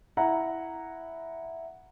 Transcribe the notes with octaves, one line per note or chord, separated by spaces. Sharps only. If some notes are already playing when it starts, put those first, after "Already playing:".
E4 F#5 A#5